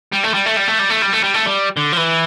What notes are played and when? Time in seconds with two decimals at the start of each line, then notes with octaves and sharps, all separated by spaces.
0.13 G3
0.24 A3
0.34 G3
0.46 A3
0.57 G3
0.68 A3
0.79 G3
0.90 A3
1.02 G3
1.13 A3
1.24 G3
1.34 A3
1.46 G3
1.77 D3
1.92 F3
1.97 E3